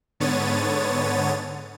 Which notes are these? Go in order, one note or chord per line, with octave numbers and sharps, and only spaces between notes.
G#2 D3 B3 C#5 A6 D#7